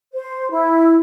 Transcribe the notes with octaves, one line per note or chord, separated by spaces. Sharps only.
C5
E4